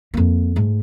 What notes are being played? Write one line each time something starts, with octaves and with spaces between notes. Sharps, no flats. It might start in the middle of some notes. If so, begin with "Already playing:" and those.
F2 A#3
G#2 A3